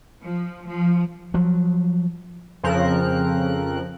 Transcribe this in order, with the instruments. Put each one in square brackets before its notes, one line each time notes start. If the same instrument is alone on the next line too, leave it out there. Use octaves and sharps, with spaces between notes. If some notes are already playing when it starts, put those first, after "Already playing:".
[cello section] F3
F3
[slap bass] F3 F#3
[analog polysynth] F2 C#3 F3 C4 A#4 F#6